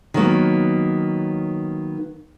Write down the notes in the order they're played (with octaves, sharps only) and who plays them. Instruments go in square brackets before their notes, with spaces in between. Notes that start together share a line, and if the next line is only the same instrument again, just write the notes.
[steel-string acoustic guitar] D#3 F#3 A#3 B3